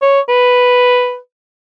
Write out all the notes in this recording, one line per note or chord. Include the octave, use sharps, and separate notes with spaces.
C#5
B4